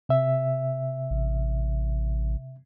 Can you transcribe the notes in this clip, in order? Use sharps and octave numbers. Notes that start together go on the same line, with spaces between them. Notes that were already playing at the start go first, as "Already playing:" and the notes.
C3 E5
A1